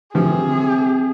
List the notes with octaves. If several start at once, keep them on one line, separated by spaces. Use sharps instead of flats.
C3 F3 C4 G#4